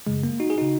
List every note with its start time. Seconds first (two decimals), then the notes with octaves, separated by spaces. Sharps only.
0.07 F#2 C#3 G#3
0.23 A#3
0.40 D#4 F#4
0.50 G#4
0.58 C#3 D#4 F#4